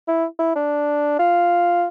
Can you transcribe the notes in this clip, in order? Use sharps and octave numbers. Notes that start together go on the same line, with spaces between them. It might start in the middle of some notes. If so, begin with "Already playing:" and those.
E4
E4
D4
F4